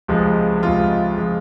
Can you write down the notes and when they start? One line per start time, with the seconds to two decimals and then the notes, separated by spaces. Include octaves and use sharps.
0.08 C#2 C3 F3 G#3
0.62 C#2 C3 F3 G#3 F4
1.18 F3 G#3